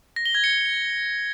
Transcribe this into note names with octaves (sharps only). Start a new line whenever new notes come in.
A#6
G7
G#6
C#7